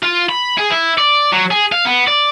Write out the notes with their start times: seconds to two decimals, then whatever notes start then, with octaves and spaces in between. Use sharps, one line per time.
0.03 F4
0.29 B5
0.58 G#4
0.70 E4
0.98 D5
1.33 F#3
1.51 G#4
1.72 F5
1.85 B3
2.07 D5